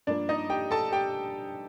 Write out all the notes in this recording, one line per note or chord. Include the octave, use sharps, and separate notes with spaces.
G2 F3 A#3 D4 D5
D#4 D#5
G4 G5
A4 A5
G4 G5